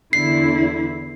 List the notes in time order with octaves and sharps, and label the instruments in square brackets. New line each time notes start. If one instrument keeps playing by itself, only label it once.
[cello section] E2 D3 E4 [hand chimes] C7